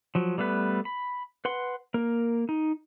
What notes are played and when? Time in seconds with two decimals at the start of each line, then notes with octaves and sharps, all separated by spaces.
0.15 F3 F#3
0.38 G3 A3 B3 B4
0.85 B5
1.45 B4 F#5 C6
1.94 A#3 A#4
2.49 D#4